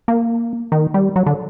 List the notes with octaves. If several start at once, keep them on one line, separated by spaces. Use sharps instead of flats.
A#3
D#3
G3
F#3
D3